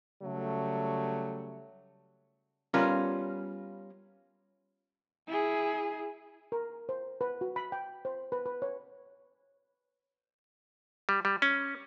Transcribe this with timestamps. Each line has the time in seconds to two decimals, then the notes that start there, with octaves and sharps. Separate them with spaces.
0.23 C#3 F#3 G3 A3
2.74 G3 B3 C#4 F4 A#4
5.28 E4 G#4
6.52 A#4
6.89 C5
7.21 B4
7.41 F#4
7.56 B5
7.72 G5
8.05 C5
8.32 B4
8.46 B4
8.62 C#5
11.09 G3
11.25 G3
11.42 C#4